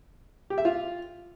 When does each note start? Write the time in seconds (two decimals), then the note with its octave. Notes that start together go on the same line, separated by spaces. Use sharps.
0.50 G4
0.58 E5
0.65 F4